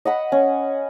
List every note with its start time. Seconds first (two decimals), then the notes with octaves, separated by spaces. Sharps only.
0.05 D#5 F#5 B5
0.32 C#4